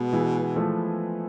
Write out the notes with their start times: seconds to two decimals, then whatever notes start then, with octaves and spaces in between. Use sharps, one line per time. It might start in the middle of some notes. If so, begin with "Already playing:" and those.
Already playing: B2 G#3 B3
0.13 E3 G#3
0.56 F3 A3